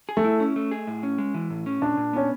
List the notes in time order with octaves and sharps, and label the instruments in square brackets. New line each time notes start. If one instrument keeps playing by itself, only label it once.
[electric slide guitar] G#4
[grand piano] A3
[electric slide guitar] E4
C#4
A3
G#4
A2
C#4
G#3
E3
A2
C#4
[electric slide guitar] A#2 [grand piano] D4
[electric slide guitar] A#2
[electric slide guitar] B3 [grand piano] C#4